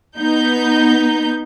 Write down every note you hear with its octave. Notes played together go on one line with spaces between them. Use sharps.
B3 D#4 G6